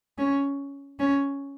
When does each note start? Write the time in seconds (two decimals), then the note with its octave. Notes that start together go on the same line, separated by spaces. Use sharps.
0.18 C#4
1.00 C#4